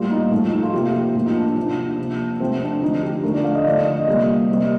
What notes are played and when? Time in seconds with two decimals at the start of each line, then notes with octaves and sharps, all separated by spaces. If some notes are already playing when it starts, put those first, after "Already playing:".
Already playing: A2 G3 A#3 F4
0.11 D#4
0.31 A2 F3 A3 D#4
0.52 D#4
0.63 F4
0.73 C3 F3 A#3 G4
0.94 G4
1.15 A2 F3 A#3 F4
1.26 D#4
1.36 D4
1.46 D4
1.57 C3 F3 A#3 D4
1.98 C3 F3 A#3
2.40 C3 F3 A3 C4
2.61 D4
2.82 D3 F3 A3 D#4
3.03 G4
3.23 D3 F3 A3 A#4
3.34 D5
3.44 F5
3.55 D#5
3.65 D3 F3 A3 D5
3.76 D#5
3.86 D#5
3.97 D#5
4.07 C3 G3 A#3
4.49 C3 G3 A#3